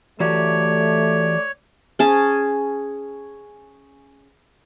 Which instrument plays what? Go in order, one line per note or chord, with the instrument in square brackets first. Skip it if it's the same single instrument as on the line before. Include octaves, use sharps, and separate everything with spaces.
[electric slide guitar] E3 F#4 G4 [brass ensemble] A3 [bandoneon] C#5 [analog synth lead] D5
[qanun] C#4 G#4 A5